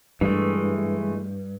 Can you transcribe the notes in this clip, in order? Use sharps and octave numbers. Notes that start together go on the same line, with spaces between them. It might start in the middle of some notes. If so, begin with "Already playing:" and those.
G2 E3 G#3 A3